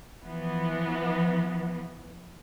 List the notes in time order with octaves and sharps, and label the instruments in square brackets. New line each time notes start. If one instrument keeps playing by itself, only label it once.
[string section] E3 F3 B3